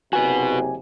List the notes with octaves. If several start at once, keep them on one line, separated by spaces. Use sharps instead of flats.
F#1 C3 F#4 B4 G#5